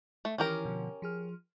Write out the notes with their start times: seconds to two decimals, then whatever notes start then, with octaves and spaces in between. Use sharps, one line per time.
0.25 A3
0.38 D#3 E3 C#4 E4 G4 A#4
0.65 B2 D3 F3
1.02 F3 G#4 F6